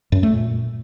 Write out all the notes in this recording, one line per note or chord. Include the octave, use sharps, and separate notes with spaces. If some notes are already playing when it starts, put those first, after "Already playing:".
F#2
A3
A#2